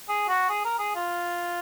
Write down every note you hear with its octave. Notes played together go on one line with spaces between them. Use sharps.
G#4
F#4
G#4
A#4
G#4
F4